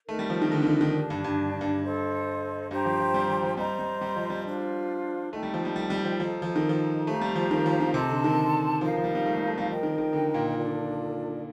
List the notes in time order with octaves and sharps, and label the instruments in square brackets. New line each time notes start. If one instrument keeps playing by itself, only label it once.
[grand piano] A3 [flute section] D#4 A#4 D#5
[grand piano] G3
F3
D#3
D3
D#3
D3
D#3
[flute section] D4 G4 D5 A5
[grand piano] G2
G2
G2
[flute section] A4 C5 D#5
[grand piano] G2 [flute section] G4 C5 G5 A#5
[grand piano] F3
F3
G3
F3
F3
[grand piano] G3 [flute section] C5 D#5 A#5
[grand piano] G3
G3
F3
G3
[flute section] D4 F4 C5
[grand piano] A3 [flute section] D#4 A4 D#5 G5
[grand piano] G3
F3
G3
G3
G3
F3
[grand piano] F3 [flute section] A4 D#5 A#5
[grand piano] F3
D#3
F3
[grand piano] A3 [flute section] G4 C5 F5 A#5
[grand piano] G3
F3
D#3
F3
D#3
[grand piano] C3 [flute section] A4 D#5 A5 C6
[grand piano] D3
D#3
[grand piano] F3 [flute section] D#4 A#4 F5
[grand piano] F3
G3
G3
A3
G3
A3
G3
[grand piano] F3 [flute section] A#4 D#5 G5
[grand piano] D#3
D#3
D3
A#2
[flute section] D4 F4 A4 D5